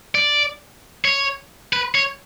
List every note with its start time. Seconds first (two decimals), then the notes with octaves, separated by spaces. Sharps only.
0.15 D5
1.05 C#5
1.73 B4
1.95 C#5